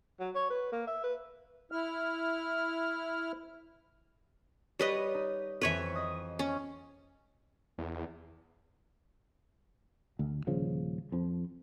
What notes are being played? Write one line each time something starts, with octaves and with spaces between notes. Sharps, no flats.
F#3
C#5
B4
A#3
E5
B4
E4 F6
G3 B4 C#5 D#5
D#4
F2 E3 B4 C#5 E5
D#5 D#6
C#4
E2
D2
D#1 C#3 F3
F2 F3